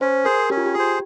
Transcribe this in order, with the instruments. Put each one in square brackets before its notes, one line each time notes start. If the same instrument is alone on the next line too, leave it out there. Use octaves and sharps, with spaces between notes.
[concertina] C#4 [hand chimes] C5
[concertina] G#4 C5 [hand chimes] A#4
[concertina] C#4 [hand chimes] G4
[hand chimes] F4
G4
[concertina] G#4
C5